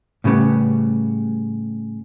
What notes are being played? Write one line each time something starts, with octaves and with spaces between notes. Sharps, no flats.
A2 C#3 G3 B3